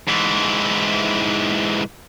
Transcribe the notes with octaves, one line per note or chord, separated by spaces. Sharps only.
G#2 E3